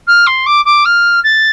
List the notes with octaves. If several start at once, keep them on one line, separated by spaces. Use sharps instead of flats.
F6
C6
D6
D6
F6
A6